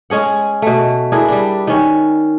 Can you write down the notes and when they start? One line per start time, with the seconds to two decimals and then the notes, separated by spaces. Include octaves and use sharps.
0.10 G#3 C#4 G#4 F#5
0.62 B2 A3
1.12 D4 E4 G#4 A#4
1.28 G3 D4
1.67 D#3 C#4